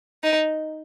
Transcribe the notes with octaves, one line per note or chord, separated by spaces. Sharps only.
D#4